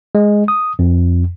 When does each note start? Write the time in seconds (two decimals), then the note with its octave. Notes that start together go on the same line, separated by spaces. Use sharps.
0.15 G#3
0.48 D#6
0.79 F2